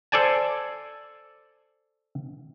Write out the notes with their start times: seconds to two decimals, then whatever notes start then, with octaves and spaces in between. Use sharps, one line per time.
0.12 A4 C5 D5 G#5 A5